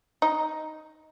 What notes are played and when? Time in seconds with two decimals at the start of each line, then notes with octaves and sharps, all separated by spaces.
0.22 D#4